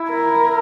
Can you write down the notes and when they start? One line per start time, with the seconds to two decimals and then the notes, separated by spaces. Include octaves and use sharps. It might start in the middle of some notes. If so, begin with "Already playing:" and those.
Already playing: E4
0.11 A#4